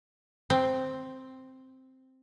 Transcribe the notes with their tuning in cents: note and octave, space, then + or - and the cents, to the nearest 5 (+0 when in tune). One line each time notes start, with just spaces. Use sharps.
C4 +0